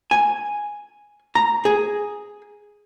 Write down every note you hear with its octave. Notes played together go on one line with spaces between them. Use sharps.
G#5
A#5
G#4